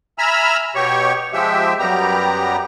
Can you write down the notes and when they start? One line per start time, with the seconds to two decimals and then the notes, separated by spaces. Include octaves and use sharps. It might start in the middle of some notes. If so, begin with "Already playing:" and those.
0.18 E5 G#5 A#5 B5 E6 F6
0.75 B2 G4 C#5 C#6
1.33 F3 G#3 G4 E5
1.79 F#2 G3 B3 G4 A#5